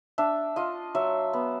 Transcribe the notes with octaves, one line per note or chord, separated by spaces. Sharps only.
D4 E5
F4 D#5
F#3 E5
B3